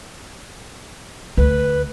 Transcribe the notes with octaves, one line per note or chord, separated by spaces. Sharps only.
D2 B4